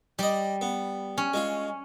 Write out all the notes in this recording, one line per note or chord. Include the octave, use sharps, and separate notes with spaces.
G3 D5 D#5
B3
C#4
G#3 F4